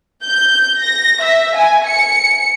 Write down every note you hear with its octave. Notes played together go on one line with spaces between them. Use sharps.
G6
A#6
E5
G#5
C#7